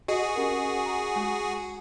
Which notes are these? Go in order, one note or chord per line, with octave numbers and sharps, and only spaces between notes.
F#4 G#4 D#5
C#4 G4 A#4
A#5
G#3 G#5